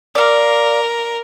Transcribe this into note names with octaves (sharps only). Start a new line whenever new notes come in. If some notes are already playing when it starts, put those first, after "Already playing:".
A#4 D5 F5